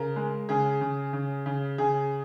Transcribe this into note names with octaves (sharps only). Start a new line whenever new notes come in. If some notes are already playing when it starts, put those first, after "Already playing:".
Already playing: C#3 A#4
G#3
C#3 G#4
C#3
C#3
C#3
C#3 G#4